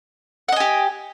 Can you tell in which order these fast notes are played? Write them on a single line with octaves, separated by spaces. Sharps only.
F#5 D#5 G#5 G4